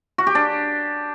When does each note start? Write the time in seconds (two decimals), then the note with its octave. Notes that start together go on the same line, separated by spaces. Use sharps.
0.18 F#4
0.27 G4
0.35 D4